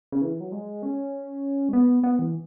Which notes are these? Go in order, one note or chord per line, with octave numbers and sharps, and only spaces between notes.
C#3
E3
F#3
G#3
C#4
G#3
B3
B3
E3